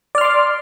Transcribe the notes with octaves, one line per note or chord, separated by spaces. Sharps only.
D5 C6 D6 F6